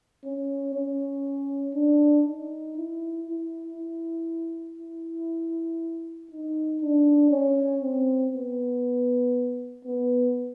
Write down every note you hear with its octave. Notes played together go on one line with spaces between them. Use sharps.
C#4
C#4
D4
D#4
E4
E4
E4
E4
D#4
D4
C#4
C4
B3
B3